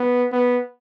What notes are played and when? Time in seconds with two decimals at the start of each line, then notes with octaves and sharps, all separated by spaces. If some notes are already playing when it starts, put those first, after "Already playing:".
Already playing: B3
0.32 B3